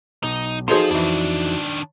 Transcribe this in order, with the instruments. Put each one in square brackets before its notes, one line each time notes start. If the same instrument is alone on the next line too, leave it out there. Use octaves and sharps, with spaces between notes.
[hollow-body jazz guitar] B1 [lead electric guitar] D#4
[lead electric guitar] F3 [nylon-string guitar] D#4 F#4 C5 [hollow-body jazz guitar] G#4 A4 C6
[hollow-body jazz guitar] F2 E3 [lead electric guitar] D#3 D4